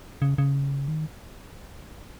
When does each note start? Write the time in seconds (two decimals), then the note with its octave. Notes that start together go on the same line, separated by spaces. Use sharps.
0.22 C#3
0.38 C#3
0.88 D#3